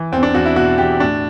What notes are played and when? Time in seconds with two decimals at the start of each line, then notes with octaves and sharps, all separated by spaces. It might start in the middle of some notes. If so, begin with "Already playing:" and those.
Already playing: E3
0.12 E2 C4
0.23 D4
0.34 E2 F#4
0.46 E4
0.56 B2 F#4
0.78 E2 G4
1.00 A2 D4